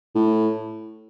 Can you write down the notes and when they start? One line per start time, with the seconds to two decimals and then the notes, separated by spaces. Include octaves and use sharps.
0.15 A2